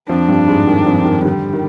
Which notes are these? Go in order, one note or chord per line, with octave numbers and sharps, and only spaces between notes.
F2 F3 D4
G2 G3
G#2 G#3
D#3
F2 F3
D#3
D3 G3
D#3